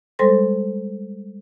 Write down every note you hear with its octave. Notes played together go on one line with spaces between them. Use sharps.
G3 G#3 A4 C5 C6 A#6